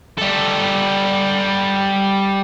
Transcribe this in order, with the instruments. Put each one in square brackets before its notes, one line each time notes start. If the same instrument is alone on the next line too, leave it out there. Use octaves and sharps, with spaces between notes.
[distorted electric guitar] G3 A4